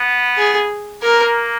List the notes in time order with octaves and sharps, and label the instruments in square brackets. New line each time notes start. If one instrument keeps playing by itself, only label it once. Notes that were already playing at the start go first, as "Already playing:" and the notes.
Already playing: [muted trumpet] B3
[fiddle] G#4
[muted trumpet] A#3 [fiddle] A#4